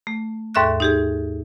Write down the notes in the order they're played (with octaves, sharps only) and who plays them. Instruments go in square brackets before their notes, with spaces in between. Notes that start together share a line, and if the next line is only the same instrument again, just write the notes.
[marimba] A3
D#2 G#2 A4 E5 C#6 F#6
D#4 G4 G#4